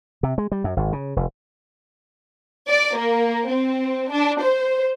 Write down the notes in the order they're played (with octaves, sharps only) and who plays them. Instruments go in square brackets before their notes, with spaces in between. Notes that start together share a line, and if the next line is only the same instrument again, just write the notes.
[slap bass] C3
G#3
G3
F#2
G#1
C#3
F1
[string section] D5
A#3
C4
D4
C5